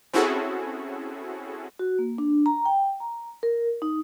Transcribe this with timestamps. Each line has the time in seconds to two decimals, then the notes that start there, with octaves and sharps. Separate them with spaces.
0.13 C4 C#4 E4 F#4 G#4 A4
1.79 F#4
1.99 A#3
2.18 D4
2.46 A#5
2.65 G5
3.00 A#5
3.43 A#4
3.82 D#4